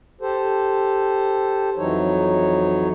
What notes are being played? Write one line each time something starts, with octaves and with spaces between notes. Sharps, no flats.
G4 A4 C5
F2 E3 F#3 D#4 C#5